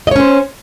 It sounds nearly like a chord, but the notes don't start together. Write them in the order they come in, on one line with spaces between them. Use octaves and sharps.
D#5 C#5 C#4 C5